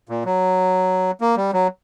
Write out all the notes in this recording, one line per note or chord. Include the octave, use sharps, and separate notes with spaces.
A#2
F#3
A#3
G3
F#3